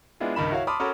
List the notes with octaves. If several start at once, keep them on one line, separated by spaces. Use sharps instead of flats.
G#3 B3 D4 E4 F4
C#2 G2 D#3 B5 E7
E4 F#4 C#5 F5
A5 B5 C6 D6 D#6 F6
C#4 F#4 A4 A#4 B5